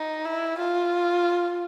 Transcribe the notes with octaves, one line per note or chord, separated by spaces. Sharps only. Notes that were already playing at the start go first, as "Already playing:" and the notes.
Already playing: D#4
E4
F4